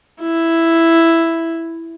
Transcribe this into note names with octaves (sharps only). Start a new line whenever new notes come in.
E4